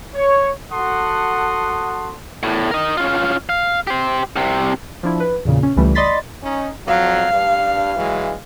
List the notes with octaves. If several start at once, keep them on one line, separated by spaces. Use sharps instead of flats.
C#5
F#4 A4 F#5 A5 C6 D#6
E2 A2
A#4 D#5
C#4 F4
F5
G4 C5
C2 C3
F3 D4 E4
B4
E2 A#2 C#3
C#4
C#2 E3 G3 A3
D5 D#5 B5 C6 A6 B6
C#4 D#4
F2 F#3 F5
G2
E3 F#3 G#3